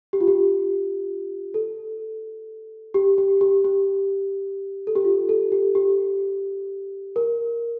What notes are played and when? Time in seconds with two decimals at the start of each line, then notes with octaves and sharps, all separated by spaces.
0.13 G4
0.21 F4
0.28 G4
1.54 A4
2.94 G4
3.18 G4
3.41 G4
3.65 G4
4.87 A4
4.96 G4
5.05 F4
5.29 A4
5.52 G4
5.75 G4
7.16 A#4